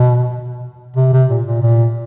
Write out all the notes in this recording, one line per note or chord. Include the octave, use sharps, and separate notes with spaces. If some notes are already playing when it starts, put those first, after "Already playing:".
Already playing: B2
C3
C3
A#2
A#2
A#2